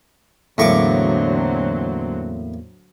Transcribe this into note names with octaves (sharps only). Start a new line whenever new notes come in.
E2 A2 D3 F#3 A#3 C4 C#6 D6